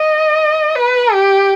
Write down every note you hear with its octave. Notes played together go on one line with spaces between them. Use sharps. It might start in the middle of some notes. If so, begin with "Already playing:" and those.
Already playing: D#5
B4
G4